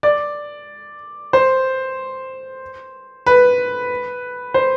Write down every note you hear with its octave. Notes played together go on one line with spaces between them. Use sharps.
D5
C5
B4
C5